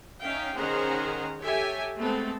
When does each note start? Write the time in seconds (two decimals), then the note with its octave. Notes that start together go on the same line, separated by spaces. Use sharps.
0.22 C#4 D#4 E5 F5 G5
0.56 D#3 C#4 G#4 C5 F#5 A#5
1.40 G4 A4 C#5 E5 G5 G#5
1.98 G#3 A3 B3 C4 A4